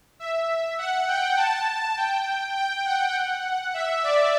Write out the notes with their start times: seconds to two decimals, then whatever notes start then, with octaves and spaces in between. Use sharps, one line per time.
0.20 E5
0.78 F#5
1.08 G5
1.37 A5
1.97 G5
2.56 G5
2.85 F#5
3.74 E5
4.03 D5